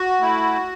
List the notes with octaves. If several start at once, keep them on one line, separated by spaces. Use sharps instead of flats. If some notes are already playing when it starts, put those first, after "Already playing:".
Already playing: F#4
A3 E4